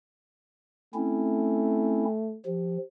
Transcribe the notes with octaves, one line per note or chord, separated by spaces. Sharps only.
A3 C4 C#4 E4
F3 G4